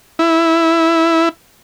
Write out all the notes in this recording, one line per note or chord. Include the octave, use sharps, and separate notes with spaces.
E4